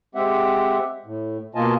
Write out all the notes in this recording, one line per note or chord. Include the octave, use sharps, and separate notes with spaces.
G#3 C4 G4 E5 F#5
A2
B2 A#3 F4 D#5 G#5 A5